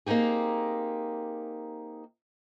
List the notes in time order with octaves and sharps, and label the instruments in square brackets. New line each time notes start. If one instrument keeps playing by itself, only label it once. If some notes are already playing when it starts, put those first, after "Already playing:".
[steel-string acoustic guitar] A#3 C4 D#4 G4 G#4